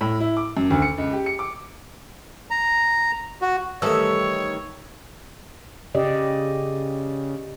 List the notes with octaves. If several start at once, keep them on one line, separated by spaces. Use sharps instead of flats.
A2
E4
D6
F#2
D2
C#7
C#2
G4
C#7
D6
A#5
F#4
D#3 E3 G3 A3 A4 C#5 E6
C#3 G4 D5 D#5